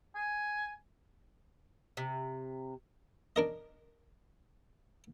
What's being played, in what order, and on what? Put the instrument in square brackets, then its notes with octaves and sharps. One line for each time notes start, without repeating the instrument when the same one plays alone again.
[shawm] G#5
[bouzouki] C3
[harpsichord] D4 A#4 D#5